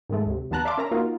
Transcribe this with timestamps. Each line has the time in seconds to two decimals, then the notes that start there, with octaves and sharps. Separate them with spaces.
0.10 G#2 D#3 G#3 A3
0.26 D2 C3
0.51 D#2 D#3 B3 A5 A#5 F#6
0.65 D5 E5 F5 A5 C6 D6
0.78 C#4 A#4 E5 A#5
0.91 A#3 D#4 F4 F#4 A#4